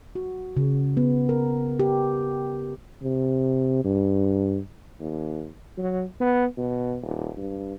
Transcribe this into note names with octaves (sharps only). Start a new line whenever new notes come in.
F#4
C#3
B3
A#4
G4
C3
G2
D#2
F#3
B3
B2
D#1
G2